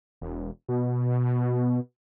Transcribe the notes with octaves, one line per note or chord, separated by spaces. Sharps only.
E1
B2